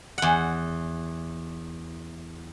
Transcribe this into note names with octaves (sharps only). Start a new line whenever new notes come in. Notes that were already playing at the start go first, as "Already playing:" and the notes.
E2 F#5